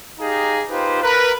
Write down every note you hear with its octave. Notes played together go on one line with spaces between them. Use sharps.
D#4 G4 G#4 F5 A#5
D#4 F4 G4 B4 C5
A#4 B4